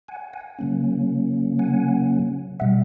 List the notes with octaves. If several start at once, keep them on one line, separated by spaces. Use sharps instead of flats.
F#5 G#5
F#5 G#5
C#3 F#3 A#3 C#4
F#5 G#5
B2 G3 E5 F#5